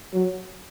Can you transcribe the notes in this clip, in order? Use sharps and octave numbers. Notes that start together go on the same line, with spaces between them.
F#3